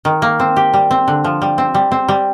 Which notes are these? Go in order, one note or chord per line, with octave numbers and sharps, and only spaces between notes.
D#3
A#3
C4
G4
G3
C4
D3
F3
G3
C4
G3
C4
G3